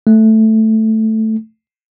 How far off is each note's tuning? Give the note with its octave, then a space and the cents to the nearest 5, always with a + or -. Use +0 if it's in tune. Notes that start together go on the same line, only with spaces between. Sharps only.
A3 +0